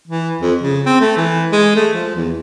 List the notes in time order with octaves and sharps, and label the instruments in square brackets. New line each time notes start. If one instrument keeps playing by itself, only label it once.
[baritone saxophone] E3
F2
C#3
C4
A3
E3
G#3
A3
F3
E2